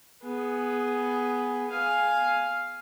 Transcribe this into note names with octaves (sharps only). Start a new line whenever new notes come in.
B3 G#4
F5 G#5